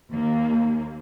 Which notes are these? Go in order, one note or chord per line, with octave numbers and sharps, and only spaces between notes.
D#2 A#3